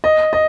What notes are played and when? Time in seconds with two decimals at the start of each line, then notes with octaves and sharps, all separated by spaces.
0.04 D#5
0.33 D#5